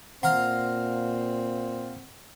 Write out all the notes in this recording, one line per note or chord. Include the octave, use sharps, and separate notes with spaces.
A#2 C4 F5 F#5 A#5 C6